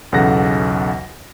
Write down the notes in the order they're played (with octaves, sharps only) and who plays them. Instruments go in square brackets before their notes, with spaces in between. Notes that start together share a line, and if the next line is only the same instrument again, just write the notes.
[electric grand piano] B1 E2 C#3 A4 F#5 A#6